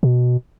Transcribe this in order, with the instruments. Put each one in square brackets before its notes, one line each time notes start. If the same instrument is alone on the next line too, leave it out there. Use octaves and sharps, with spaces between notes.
[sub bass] B2